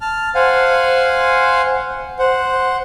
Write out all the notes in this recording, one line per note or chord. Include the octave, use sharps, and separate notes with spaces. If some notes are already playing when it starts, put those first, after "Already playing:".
A5 F6
C5 F5 F#5 G#5
C5 F#5